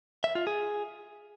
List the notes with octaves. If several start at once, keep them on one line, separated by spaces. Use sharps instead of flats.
E5
F4
G#4